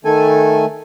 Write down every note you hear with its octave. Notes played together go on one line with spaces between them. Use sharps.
D#3 A3 A4 G#5